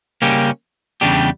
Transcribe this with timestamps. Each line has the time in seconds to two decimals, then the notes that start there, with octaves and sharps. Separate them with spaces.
0.22 C#3 G3 A#3 C#4 G4
1.01 E2 C#3 G3 D4 G4